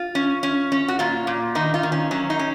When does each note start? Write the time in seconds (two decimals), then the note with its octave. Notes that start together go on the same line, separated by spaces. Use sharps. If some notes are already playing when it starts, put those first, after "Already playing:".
Already playing: F4
0.15 C#4
0.43 C#4
0.72 C#4
0.88 F#4
0.99 A#2 F4
1.27 A#2
1.55 D#3 D#4
1.74 F4
1.83 D#3
1.92 C#4
2.11 F#3 C#4
2.30 D#4
2.39 C#4